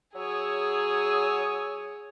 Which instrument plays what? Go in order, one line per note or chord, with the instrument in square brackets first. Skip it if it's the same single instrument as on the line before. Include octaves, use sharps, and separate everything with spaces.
[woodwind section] F#3 D#6 E6 [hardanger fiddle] G#4 C#5